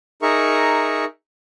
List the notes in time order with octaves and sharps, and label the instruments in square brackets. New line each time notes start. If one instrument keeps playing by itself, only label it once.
[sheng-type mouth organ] D#4 G#4 A#4 E5 A#5 C#6